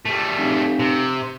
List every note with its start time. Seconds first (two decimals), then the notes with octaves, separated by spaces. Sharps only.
0.06 G3 A3
0.36 F1
0.80 C3